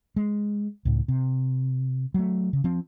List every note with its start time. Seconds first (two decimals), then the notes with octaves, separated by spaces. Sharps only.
0.16 G#3
0.85 C#2 A2
1.08 C3
2.14 F#3 A3
2.53 C#3
2.64 F3 C4